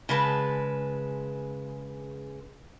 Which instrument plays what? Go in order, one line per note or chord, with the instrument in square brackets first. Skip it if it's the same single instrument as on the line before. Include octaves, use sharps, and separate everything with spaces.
[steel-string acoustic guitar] C#3 G#3 B4 A5